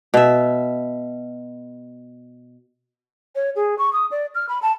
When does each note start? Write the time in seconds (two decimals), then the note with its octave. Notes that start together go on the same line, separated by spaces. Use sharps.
0.14 B2 E5
3.35 C#5
3.56 G#4
3.78 C#6
3.93 D#6
4.11 D5
4.35 F6
4.49 B5
4.62 A5